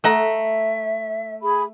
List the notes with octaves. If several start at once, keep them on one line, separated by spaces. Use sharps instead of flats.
A3 D#5 E5 F#5 A#5
G#4 B5